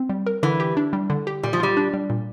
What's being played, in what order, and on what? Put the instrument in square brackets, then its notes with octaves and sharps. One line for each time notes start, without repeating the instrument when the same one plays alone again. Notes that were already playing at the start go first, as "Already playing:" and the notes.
Already playing: [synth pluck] C4
G3
A#4
[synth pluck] D3 [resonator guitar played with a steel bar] E3
[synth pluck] G4
D4
G3
D3
G4
[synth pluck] A#2 [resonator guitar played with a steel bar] G3
[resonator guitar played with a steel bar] F3
[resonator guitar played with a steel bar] G3 [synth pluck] F4
[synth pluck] D4
G3
A#2